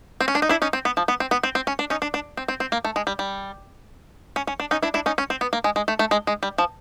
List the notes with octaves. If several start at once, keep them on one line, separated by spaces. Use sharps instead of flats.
C4
C#4
D4
D#4
D4 E4
C#4 D#4
C4
B3
F3
B3
C4
B3
C4
C4
C#4
D4
C#4 D#4
D4
D4
C4
C4
C4
A#3
A3
G#3
G3
G3
C#4
C#4
D4
C#4 D#4
D4 E4
D4 E4
C#4 D#4
C#4
C4
B3
A#3
G#3
G#3
A3
A3
G#3
G#3
G3
F3